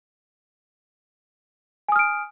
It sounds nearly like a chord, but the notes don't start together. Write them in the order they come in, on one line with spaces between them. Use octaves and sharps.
G#5 D#6 F6 D7